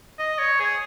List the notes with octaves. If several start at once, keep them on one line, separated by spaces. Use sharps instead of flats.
D#5
C#5
G#4